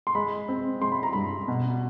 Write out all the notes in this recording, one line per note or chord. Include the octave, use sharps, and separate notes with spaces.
C6
G#3 B5
C4
G#3 C6
B5
A#5
G2 B5
B2